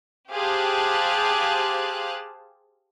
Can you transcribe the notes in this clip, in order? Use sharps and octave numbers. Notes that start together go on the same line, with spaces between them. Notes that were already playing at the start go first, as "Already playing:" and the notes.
G4 G#4 C5 F5 A5 F#6